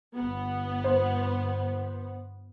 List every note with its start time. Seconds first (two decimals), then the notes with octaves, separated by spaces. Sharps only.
0.15 G1 B3
0.84 C5